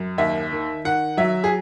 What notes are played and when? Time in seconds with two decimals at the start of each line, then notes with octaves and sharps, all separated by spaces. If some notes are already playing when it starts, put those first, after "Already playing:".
Already playing: F#2
0.18 D#2 E5
0.52 D#3
0.85 D#3 F#5
1.17 F#3 E5
1.44 G#4